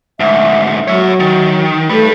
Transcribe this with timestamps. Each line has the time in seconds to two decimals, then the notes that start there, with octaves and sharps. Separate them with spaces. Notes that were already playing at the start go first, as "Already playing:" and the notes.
0.20 D2 G#2 E5
0.88 F#3 C#5 E5
1.20 D#3
1.89 G3 A3 B4